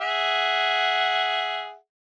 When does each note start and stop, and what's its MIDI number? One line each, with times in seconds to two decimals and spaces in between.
0.01 1.76 68
0.01 1.76 76
0.01 1.76 78